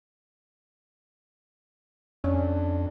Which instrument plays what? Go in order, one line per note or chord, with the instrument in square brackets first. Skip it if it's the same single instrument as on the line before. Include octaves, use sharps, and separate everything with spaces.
[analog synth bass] F2 [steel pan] C#4 [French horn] D4